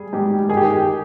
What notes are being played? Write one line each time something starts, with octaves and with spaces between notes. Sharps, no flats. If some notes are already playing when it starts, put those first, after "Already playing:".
Already playing: G3 G#4
G#2 G4
D#3 G#4
G4
G#4